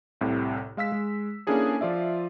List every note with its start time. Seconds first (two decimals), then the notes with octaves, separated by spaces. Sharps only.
0.21 C2 A2 C3
0.77 G#3 F5 E6 B6
0.92 G#3
1.47 A#3 C#4 D4 E4 G#4 A4
1.81 F3 F4 D5 E5